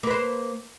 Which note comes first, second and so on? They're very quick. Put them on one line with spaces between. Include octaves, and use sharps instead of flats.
A#3 B4 C5